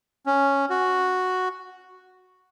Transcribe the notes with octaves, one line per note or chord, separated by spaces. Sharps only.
C#4
F#4